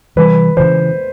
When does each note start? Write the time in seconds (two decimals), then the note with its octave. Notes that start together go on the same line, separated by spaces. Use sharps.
0.16 C3 E3 G3 B4
0.57 C#3 E3 C5